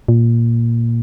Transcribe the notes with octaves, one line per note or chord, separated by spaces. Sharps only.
A#2